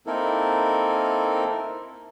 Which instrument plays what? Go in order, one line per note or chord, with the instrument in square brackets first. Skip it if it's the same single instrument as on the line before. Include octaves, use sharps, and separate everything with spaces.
[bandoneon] A#3 C4 D#4 E4 A4 A#4